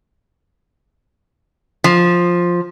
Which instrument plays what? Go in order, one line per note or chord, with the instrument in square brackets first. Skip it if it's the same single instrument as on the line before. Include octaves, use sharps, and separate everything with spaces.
[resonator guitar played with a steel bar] F3